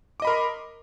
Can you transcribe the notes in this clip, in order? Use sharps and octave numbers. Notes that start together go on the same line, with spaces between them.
A#4 D#5 B5 C6 D6